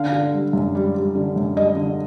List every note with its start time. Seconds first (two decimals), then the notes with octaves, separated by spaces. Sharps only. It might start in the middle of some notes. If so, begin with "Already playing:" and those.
Already playing: D3 F5
0.13 D3
0.34 G3
0.53 F#2
0.75 G3
0.94 G3
1.15 D3
1.36 F#2
1.56 G3 D#5
1.77 D3